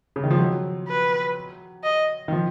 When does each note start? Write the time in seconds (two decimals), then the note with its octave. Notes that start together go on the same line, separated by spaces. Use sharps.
0.16 C#3
0.24 D#3
0.30 F3
0.39 F#3
0.88 B4
1.84 D#5
2.28 D#3
2.32 F3